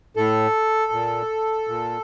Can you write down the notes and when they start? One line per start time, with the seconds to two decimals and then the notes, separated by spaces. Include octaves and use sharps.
0.16 A2 A4
0.92 A#2
1.68 A#2